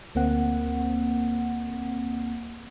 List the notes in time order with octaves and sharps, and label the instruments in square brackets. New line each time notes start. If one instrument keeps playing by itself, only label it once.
[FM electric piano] D2 A#3 C4 F#5